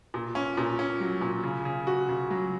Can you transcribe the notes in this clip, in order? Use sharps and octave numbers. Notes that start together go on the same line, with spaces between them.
A#2
C#4
A#2
C#4
F#3
A#2
C#3
C#3
F#4
C#3
F#3